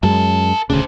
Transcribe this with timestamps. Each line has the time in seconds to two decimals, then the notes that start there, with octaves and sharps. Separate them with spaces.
0.03 F#2 G#3 A#4 A5
0.70 D#1 D2 C#3 D4 C5